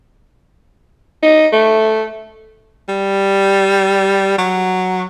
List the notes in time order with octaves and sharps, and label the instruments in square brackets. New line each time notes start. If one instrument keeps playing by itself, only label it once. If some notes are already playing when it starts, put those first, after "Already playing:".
[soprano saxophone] D#4
A3
[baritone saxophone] G3
F#3